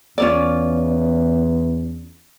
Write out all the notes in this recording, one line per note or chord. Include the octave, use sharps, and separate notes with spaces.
E2 C#4 F4 D5